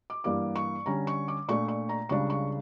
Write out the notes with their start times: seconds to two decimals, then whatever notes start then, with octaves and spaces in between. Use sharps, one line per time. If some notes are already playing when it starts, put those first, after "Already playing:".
0.10 D6
0.24 G2 E3 G3 A#3 D6
0.56 C#6
0.86 D3 G3 C#4 A#5
1.07 C#6
1.28 D6
1.48 A#2 A3 D4 C#6
1.68 C#6
1.89 A#5
2.09 C#2 C#3 G3 D4 C#6
2.30 C#6